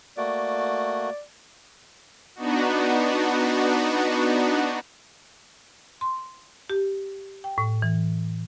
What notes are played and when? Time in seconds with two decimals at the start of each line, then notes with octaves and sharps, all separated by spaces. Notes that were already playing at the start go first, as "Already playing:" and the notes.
0.17 A3 A#3 F#4 D5
2.35 B3 D4 D#4 F#4
6.01 C6
6.70 G4
7.44 G5
7.58 A2
7.82 E3